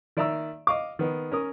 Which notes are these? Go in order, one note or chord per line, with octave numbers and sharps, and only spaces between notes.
D#3 D5 E5 A#5 E6
D#5 F5 D6
D#3 B3 D#4
C#4 A#4 D#6